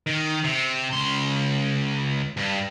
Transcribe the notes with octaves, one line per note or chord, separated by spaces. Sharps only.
D#3
C3
C#2 C6
G2